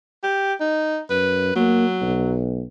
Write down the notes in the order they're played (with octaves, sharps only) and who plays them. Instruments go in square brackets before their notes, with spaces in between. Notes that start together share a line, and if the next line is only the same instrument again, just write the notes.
[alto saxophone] G4
D#4
[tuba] F#2 [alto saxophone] B4
[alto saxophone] F#3 [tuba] A#3
[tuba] B1